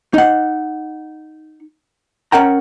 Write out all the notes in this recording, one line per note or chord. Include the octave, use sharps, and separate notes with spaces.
D#4 F#5
C#4 A#4 F#5 G5 A#5